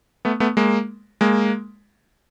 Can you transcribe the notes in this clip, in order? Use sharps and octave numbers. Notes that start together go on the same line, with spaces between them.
A3 B3
A3 B3
G#3 A#3
G#3 A#3